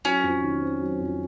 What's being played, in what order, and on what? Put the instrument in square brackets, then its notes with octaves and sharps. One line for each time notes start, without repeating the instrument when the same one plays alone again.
[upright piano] F#3 [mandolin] C#4
[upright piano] F2
D#3
C4
F#3
F2